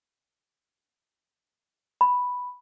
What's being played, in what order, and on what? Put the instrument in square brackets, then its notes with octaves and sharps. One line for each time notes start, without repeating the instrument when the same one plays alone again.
[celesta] B5